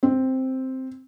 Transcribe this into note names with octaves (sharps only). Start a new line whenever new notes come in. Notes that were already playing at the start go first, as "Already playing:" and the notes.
C4